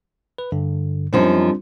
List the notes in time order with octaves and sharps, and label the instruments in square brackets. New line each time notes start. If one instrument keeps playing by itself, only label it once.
[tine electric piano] B4
G2 D3
[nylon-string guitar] F#2 F3 D#4 [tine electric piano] G3 C4 D4